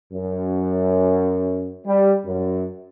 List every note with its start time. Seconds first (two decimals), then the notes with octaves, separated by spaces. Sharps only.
0.12 F#2
1.85 G3
2.25 F#2